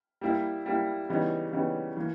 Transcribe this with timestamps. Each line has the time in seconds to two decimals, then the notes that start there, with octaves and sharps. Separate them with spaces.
0.21 G3 A#3 E4
0.66 G3 A#3 E4
1.09 C#3 E3 G3 B3 D#4
1.52 C#3 E3 G3 B3 D#4
1.97 E3 A#3